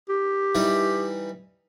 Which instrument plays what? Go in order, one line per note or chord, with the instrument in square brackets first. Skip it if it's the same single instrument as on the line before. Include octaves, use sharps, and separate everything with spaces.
[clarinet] G4
[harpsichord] E3 G3 D#4